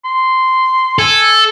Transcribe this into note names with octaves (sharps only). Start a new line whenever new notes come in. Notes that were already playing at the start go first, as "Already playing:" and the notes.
C6
A4 G#5